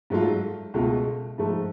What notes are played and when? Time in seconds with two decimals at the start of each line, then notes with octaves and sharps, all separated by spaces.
0.10 G#2 F#3 A3 F4
0.74 C#2 B2 A3 F4
1.38 G#2 F3 A3